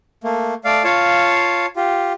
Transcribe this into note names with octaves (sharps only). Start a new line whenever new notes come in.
A3 A#3
A3 D5 F5
F4 C#5 F5 A5
F4 G4